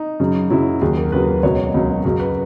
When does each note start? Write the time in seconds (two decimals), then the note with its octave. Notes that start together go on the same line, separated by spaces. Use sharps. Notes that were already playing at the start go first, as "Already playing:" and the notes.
Already playing: D#4
0.20 F#2 C#3 F#3
0.50 F#2 C#3 F#3 E4
0.81 D#2 C#3 F#3 G#4
0.97 A#4
1.12 D#2 C#3 F#3 B4
1.43 C#2 B2 F#3 C#5
1.74 C#2 B2 F#3
2.05 F#2 C#3 F#3
2.20 B4